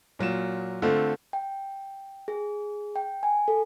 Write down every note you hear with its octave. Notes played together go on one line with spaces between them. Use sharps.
A#2 F#3 F4 E7
D3 A3 C4 F4 A4
G5
G#4
G5
G#5
A4